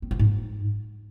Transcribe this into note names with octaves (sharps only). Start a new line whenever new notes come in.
C4
F3
G#2